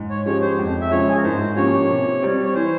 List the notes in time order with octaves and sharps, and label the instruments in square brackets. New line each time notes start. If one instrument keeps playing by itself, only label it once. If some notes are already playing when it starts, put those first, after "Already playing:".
Already playing: [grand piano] G#2
[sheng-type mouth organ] C#5
[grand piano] F3 G#3 C#4 G4 [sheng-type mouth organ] C#5
[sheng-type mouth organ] C5
[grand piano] F2
[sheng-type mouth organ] E5
[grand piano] C#3 F3 G#3 [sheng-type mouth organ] C#5
[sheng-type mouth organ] G#4
A#4
[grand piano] G#2 [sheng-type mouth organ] C5
[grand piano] F3 A#3 C#4 G4 [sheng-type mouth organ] C#5
[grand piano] C3
G3 C4
[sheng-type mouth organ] C#5
[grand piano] E3 [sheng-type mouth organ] C5